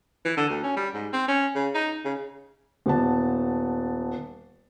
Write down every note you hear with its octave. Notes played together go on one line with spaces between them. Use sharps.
E3
D3
D2
C#4
G3
G#2
C4
C#4
C#3
D#4
C#3
D#1 B3 A5